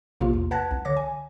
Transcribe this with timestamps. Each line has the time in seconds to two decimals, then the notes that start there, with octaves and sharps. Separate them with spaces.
0.21 A#1 C3 A#3 F4
0.33 E2
0.51 B4 F#5 A5 F#6 G#6 A#6
0.71 C2
0.85 D3 C#5 D6 A#6
0.97 G#5